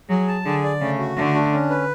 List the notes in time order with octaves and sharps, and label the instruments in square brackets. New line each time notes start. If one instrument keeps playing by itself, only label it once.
[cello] F#3 [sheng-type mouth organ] G#4
[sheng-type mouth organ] A5
[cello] D3 [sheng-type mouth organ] G#4
[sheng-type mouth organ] D5
[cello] C#3 [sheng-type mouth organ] A3
[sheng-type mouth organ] F#4
[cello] D3 [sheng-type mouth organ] A3
[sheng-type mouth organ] D4
C#4
B4